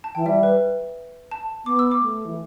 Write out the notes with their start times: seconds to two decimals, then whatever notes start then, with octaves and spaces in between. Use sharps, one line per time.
0.04 A5
0.15 E3 G5
0.26 G3 E5
0.43 B4
1.31 A5
1.65 B3 D6
1.79 E6
1.92 D6
2.01 A3
2.25 E3